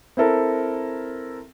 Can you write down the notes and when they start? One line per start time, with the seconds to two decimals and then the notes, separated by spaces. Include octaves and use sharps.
0.17 C4 E4 A4 A#4